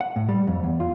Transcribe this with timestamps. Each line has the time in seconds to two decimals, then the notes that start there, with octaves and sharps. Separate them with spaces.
0.01 F#5
0.16 A2
0.29 G3
0.47 F2
0.64 E2
0.80 F4